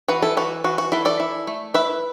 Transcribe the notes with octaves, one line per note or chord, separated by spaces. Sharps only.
E3 F#4 B4
E4 A4
E3 F#4
E3 F#4
F#4
E3 E4 A4
A4 D5
E4
A3
E4 B4 E5